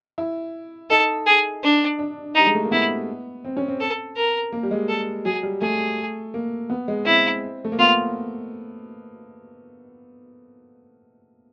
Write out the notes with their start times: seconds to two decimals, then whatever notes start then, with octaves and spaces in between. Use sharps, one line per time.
0.18 E4
0.90 D#4 A4
1.27 G#4
1.63 D4
1.99 D4
2.35 G3 D#4
2.47 G#3
2.55 A3
2.64 A#3
2.71 B3 E4
3.45 C4
3.57 C#4
3.68 C4
3.80 A4
4.16 A#4
4.52 A#3
4.63 G3
4.71 G#3
4.88 A4
5.25 F#3 G#4
5.43 G3
5.61 A3 G#4
6.34 A#3
6.70 B3
6.88 G#3
7.06 C4 E4
7.65 A3
7.72 A#3
7.79 B3 F4